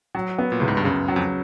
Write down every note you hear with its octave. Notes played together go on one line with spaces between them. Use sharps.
F#3
B3
A#2
C#2 A2
G#2
G2
F#2 C#3
F#3
F2